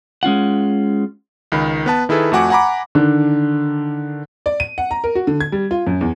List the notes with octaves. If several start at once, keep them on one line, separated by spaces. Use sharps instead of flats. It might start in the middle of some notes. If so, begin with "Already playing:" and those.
G#3 C#4 F4 F#5
C#2 D#3 B5
B3 B4 A5
D#3 E4 G#4 A4 B4
F2 A3 F#4 F#5 G#5 D6
F#5 G#5 A#5 B5 D6
D3 D#3 D4
D5
D#7
F#5
A#5
A#4
F#4
D3
G#6
G3
F4
F#2
E2